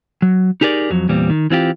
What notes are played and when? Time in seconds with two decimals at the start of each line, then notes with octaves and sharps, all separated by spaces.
0.22 F#3
0.61 D#4 G4 G#4 A#4 D5
0.90 F2 F#3
1.09 E2 A#2 G3 C4
1.30 D#3
1.50 E3 C4 F4 G4